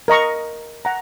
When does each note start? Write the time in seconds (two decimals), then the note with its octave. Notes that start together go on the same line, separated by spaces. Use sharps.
0.08 A#4 D#5 A#5 C#6
0.85 F#5 A#5